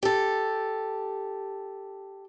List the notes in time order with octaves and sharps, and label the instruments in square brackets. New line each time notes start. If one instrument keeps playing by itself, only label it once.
[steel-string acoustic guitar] G4 A4